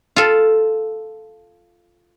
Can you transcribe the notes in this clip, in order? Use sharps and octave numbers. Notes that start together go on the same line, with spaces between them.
F4 A4